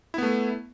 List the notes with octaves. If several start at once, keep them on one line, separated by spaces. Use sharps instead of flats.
A3 B3 E4